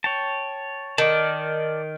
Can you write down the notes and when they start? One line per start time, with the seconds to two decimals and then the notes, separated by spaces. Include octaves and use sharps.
0.04 C#5 G5 A5
0.98 D#3 D5 A5